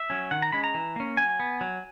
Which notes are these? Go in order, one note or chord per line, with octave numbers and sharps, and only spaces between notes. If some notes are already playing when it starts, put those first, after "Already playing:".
Already playing: E5
F#3 C#4
D#3 F#5
A#5
G#3 C#4 B5
A#5
E3
A#3 C#4
F#3 G#5
B3
F#3